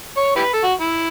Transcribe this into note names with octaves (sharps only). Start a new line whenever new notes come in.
C#5
E4 G4 B4
A4
F#4
E4